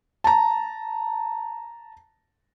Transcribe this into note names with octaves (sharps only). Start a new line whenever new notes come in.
A5 A#5